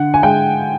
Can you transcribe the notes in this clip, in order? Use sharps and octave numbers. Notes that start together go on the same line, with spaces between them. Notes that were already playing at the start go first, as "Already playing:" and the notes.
Already playing: D3 F#5
G#5
G#3 G5